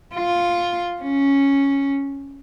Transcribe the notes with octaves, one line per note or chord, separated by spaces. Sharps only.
F4
C#4